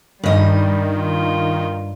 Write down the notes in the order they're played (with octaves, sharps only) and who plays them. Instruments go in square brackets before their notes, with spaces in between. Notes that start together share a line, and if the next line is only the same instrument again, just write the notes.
[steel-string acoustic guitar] G2 D#5 [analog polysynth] D#3 [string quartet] G3
[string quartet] F4